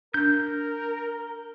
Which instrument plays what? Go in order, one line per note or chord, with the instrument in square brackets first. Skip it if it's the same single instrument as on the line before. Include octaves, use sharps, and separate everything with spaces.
[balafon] D4 [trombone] A#4 [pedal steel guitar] G6